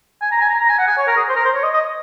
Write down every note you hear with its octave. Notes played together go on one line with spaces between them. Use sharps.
G#5
A#5
G#5
A#5
A#5
G#5
F#5
G#5
C#5
A#4
G#4
C5
A#4
C5
C#5
D#5
D#5